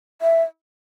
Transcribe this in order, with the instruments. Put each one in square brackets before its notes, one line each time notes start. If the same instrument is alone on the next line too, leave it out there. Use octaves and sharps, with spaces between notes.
[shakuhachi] E5